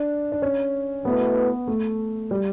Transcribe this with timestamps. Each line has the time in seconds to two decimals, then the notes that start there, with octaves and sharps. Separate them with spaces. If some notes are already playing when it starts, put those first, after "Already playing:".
Already playing: D4
0.32 D4
0.42 C#4
1.04 B2 A3 B3 E4 B4
1.67 A3
2.31 G3